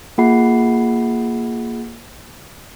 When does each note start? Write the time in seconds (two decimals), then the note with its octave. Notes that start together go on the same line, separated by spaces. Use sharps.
0.18 A#3 F4 G#4 F#5 B5 C7